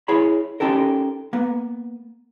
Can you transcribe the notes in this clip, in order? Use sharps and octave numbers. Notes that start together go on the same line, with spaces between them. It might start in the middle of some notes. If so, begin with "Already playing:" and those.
E4 G#4 C#5 B5
C#4 D#4 G4 A4 A#4
A#3 B3